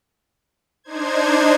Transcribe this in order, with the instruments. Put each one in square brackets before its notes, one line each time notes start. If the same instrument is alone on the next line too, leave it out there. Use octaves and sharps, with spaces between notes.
[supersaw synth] D4 D#4 C5 G#6